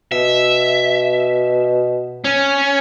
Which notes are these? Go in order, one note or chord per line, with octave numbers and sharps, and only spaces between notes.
B2 E5
C#4